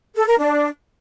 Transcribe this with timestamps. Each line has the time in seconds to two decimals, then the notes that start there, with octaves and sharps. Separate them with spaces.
0.15 A4
0.27 A#4
0.38 D4